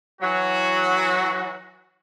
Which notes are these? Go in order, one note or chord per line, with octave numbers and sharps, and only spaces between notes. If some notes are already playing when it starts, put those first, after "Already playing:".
E3 F#3 F#4